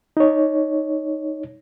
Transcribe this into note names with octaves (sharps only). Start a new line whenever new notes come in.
D#4 C#5